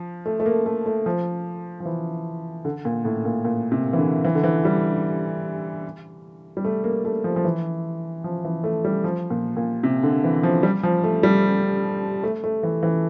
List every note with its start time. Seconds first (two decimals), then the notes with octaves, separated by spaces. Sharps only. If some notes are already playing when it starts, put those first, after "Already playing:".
Already playing: F3
0.26 A3
0.40 A3
0.46 A#3
0.66 A3
0.86 A3
1.06 F3
1.80 F3
1.86 E3
2.65 D3
2.85 A#2
3.05 A2
3.25 A#2
3.45 A#2
3.72 C3
3.93 E3
3.98 D3
4.24 E3
4.35 D3
4.44 E3
4.65 G3
6.57 G3
6.65 A3
6.84 A#3
7.05 A3
7.24 F3
7.36 F3
7.45 E3
8.24 F3
8.44 E3
8.64 A3
8.85 G3
9.04 F3
9.30 A#2
9.57 A#2
9.83 C3
10.03 D3
10.24 E3
10.43 F3
10.63 G3
10.83 F3
11.04 A3
11.23 G3
12.23 A3
12.44 A3
12.63 E3
12.83 E3